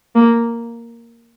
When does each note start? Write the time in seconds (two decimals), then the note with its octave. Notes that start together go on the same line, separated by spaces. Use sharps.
0.15 A#3